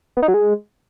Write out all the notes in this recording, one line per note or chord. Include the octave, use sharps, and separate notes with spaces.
B3
D#4
F#3
G#3